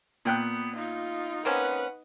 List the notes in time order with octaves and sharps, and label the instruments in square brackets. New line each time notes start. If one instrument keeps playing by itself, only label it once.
[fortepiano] A#2 G5 F#6 [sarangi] B3
[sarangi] D#4 [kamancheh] F4
[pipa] A#3 C4 C#4 [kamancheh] B4 F#5